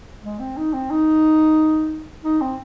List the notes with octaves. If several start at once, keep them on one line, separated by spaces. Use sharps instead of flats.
G#3
C4
D#4
C4
D#4
D#4
C4